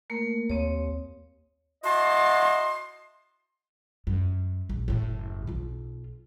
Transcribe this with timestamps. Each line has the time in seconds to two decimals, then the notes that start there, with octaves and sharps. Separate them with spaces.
0.10 A3 A#3 A#4
0.50 D#2 C4 C#5
1.83 E4 F#4 D#5 F#5 A5 C6
4.07 F#2
4.69 A#1
4.88 F#1 A2
5.47 B1 F4